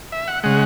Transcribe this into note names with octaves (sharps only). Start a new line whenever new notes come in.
E5
F#5
C#3 G#3 F#5